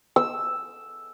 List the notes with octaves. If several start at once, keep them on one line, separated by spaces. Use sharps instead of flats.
E6